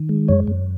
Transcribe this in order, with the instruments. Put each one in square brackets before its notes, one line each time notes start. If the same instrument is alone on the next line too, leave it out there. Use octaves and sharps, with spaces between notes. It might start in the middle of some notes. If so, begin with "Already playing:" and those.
Already playing: [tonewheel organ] D#3
G#3
F#2 C#5
F#2